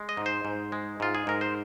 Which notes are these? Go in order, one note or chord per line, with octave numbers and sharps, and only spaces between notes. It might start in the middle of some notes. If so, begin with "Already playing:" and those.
Already playing: G#3
D#5
G#2
C5
G#2
G#3
G#2 F4
G#4
G#2 A#4
C5